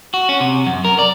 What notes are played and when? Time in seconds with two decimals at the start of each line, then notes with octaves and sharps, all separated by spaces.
0.14 F#4
0.29 C#4
0.40 C3
0.67 F#2
0.85 A#4
0.99 D5